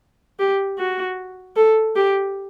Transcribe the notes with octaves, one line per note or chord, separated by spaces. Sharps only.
G4
F#4
A4
G4